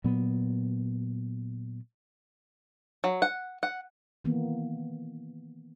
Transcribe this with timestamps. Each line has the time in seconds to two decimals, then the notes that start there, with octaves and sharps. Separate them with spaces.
0.04 A#2 F#3 B3
3.04 F#3
3.22 F#5
3.63 F#5
4.25 D#3 E3 A#3 B3